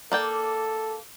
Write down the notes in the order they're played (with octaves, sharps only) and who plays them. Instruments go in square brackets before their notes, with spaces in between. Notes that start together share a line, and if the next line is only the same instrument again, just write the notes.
[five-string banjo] A#3 D5 G5 [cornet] A4